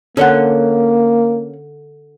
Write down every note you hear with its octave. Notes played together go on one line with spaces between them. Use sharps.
D3 A#3 C#4 C#5 F#5